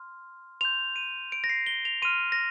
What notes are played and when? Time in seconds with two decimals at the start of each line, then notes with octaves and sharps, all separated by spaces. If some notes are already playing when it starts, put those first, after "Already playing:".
Already playing: C6 F6
0.61 C6 G6 F7
0.96 D#7
1.32 D7
1.44 A#6
1.49 C7
1.66 G7
1.85 F7
2.02 C6 F6 D#7
2.32 A#6